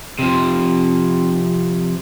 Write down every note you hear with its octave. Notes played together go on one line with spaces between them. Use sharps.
C3 F3